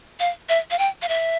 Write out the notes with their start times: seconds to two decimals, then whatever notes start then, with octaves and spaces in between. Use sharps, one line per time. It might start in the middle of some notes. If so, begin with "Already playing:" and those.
0.20 F5
0.49 E5
0.71 F5
0.79 G5
1.02 F5
1.09 E5